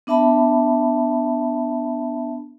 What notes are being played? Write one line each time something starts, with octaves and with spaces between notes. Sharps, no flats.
B3 D4 E5 A5 B5